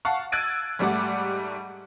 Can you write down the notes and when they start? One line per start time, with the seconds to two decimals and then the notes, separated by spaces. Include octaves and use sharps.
0.05 F5 F#5 A5 C#6
0.32 E6 F#6 G#6 A6 D7 D#7
0.79 G#2 G3 A3 F#5 D6